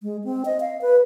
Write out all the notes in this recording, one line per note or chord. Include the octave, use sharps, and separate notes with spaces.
G#3
C4
D#5
F5
B4